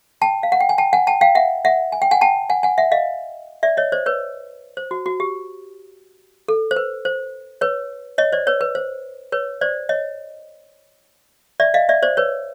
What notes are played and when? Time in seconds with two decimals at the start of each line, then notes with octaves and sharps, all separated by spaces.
0.22 G5 A5
0.43 F5
0.52 F#5
0.60 G5
0.69 G#5
0.78 G5 A5
0.93 F#5 G#5
1.07 G5 A5
1.21 F5 G5
1.35 E5 F#5
1.65 E5 F#5
1.92 G#5
2.02 G5
2.11 F#5 G#5
2.21 G5 A5
2.50 F#5 G#5
2.63 F#5 G#5
2.78 E5 F#5
2.92 D#5 F5
3.63 D5 E5
3.77 C#5 D#5
3.92 C5 D5
4.06 B4 C#5
4.77 C5
4.91 F#4
5.06 F#4
5.20 G4
6.48 A4
6.71 C5
6.76 B4
7.05 C5
7.61 B4 C#5
8.18 C#5 D#5
8.32 C5 D5
8.47 B4 C#5
8.61 B4
8.75 C5
9.32 B4 C#5
9.61 C5 D5
9.89 C#5 D#5
11.60 D5 E5
11.74 D#5 F5
11.89 D5 E5
12.03 C5 D5
12.17 B4 C#5